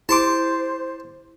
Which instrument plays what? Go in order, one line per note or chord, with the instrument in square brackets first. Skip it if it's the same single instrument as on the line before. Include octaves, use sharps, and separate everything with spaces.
[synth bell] E4 [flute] C5 [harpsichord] A5 C6 D6